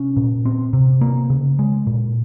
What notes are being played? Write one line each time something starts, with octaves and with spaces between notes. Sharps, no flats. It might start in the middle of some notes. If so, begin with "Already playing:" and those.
Already playing: C3 C#4
A#2
C4
C3
A#3
C#3
G#3
A#2